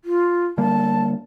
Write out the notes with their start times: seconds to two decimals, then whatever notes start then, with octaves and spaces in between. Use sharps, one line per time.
0.04 F4
0.58 D3 G3 A#3 A5